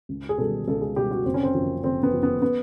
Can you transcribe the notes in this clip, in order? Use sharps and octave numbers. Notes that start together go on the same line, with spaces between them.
C#2
G#4
B2 G3 A4
C#2 A4
G#4
B2 G3 G4
F#4
F#1 C4
C#4
C4
F#2 C#3 F3
F#1 C4
B3
F#2 C#3 F3
B3
B3